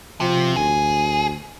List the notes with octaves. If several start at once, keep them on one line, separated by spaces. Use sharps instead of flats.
C3 F3
D2 G#4